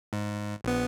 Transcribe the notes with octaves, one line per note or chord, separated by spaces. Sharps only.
G#2
A#1 B3